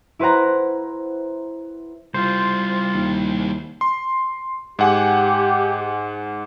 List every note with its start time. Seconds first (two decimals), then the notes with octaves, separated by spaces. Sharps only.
0.19 E4 B4 C5 F#5 A#5
2.14 G3 E4 F4 C5
2.95 D#2
3.81 C6
4.79 G#2 G4 F#5 G#5